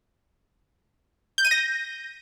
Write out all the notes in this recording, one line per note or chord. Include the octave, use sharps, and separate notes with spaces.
G6
D#7
A#6